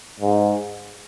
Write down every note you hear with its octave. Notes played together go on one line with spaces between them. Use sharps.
G#2